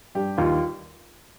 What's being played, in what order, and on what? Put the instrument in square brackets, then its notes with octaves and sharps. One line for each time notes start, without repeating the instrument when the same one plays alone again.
[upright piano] G2 G4
D#2 F4